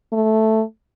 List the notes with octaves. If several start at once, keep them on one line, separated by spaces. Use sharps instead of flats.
A3